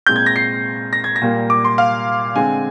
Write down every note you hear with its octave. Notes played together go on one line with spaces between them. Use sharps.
A#2 G#3 C4 G6
G#6
A#6
C7
A#6
G#6
A#6
A#2 G3 A#3
D6
C6
F5
D3 G#3 C4 G#5